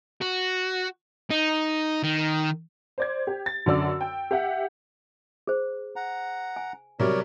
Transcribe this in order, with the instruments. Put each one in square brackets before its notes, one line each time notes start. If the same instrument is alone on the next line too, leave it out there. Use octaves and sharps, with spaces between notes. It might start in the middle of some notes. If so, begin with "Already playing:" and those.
[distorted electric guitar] F#4
D#4
D#3
[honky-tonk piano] C5 D5 G#6
G4
A6
F#2 D3 D5 E6
G5
G4 E5 F#5
[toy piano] G#4 C5
[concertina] F#5 A#5
[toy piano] G#5
[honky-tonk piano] C3 F#3 G3 [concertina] A#4 C#5 D5